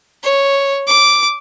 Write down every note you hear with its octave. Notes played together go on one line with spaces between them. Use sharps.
C#5
D6